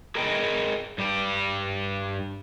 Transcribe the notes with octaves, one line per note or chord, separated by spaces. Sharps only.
G#4 A#4 B4 D#5 G5
G2 G3 G4